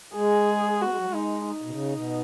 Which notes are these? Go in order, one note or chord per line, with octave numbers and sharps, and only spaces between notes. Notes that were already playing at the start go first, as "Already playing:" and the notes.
G#3 G#4
B3 F#4
G#3
F#3
G#3
D#4
D#4
B2
C#3
B2